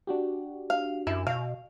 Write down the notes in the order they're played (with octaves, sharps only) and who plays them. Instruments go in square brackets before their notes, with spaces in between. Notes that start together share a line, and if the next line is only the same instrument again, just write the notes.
[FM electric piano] D4 F#4 G4
[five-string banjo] F5
[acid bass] F#2 [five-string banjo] E4
[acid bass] B2 [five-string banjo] F5